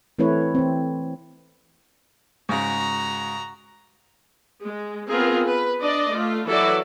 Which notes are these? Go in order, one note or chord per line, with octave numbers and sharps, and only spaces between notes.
E3 A3 C4 E4 B4 C#5
E3 C4
G#2 C#3 F#4 A#5
G#3
B3 C4 F4 G#4 A#4
B4
D4 D5 D#5
A3 F4
E3 F#3 E4 F#4 A4 D5